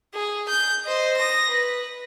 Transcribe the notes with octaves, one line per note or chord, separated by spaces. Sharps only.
G#4
G6
C5 D#5
D#6 A#6
B4